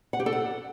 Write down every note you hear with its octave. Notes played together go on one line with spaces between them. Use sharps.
F#5
G4
A4
F#5